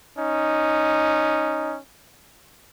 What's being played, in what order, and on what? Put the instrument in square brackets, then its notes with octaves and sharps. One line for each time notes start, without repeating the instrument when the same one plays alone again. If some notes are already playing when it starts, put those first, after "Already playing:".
[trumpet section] C#4 D#4